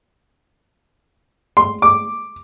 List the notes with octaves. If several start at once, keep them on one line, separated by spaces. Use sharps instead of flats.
C6
D6